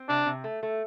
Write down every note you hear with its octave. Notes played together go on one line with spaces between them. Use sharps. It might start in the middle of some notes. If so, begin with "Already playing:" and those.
Already playing: C4
C3 D4
C3
A3
A3